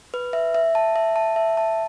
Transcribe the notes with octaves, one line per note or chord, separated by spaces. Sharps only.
B4
E5
E5
A5
E5
A5
E5
A5